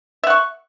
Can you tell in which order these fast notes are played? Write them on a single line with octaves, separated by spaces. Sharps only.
E5 F#5 C#6